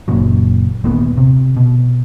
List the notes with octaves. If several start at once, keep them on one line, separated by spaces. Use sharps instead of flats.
F#1 A#2 C#3 F#3
D#1 G#1 A#2 B3
C3
B2